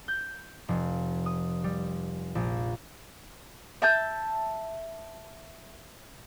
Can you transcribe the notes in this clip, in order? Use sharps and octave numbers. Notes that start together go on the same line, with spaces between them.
G6
F1
D#6
G3
A#1
E5 A5 G6